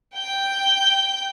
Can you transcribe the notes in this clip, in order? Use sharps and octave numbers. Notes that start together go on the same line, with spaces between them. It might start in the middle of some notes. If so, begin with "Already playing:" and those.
G5 G6